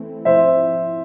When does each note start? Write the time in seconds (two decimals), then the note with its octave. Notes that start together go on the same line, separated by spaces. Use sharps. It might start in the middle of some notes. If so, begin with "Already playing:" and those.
Already playing: E3 A3 C4 E4
0.25 F3 C4 E4 C5 E5